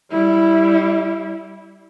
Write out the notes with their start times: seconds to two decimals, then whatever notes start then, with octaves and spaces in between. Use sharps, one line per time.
0.11 G3 E4